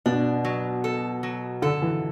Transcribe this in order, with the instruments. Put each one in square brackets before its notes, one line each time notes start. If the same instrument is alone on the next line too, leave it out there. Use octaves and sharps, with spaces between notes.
[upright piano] B2 [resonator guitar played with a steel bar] D4
[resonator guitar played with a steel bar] F#3
A4
F#3
[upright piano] D3 [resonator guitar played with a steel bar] A4
[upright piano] E3